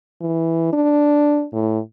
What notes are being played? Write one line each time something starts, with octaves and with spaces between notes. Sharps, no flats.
E3
D4
A2